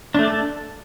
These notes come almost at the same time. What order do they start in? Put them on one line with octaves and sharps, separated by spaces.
D4 A3 D5 A4